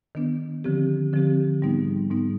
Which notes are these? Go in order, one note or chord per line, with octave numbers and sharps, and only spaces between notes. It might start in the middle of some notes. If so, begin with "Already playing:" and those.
D#3 B3 D4
D3 F3 C4 G4
D3 F3 C4 G4
G#2 G3 B3 D#4
G#2 G3 B3 D#4